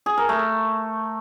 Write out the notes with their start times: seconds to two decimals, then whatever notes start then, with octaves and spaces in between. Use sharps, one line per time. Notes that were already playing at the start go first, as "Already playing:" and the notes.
0.06 G#4
0.17 A#4
0.29 A3